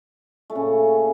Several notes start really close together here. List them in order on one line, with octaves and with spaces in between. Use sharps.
A3 A#2 C#3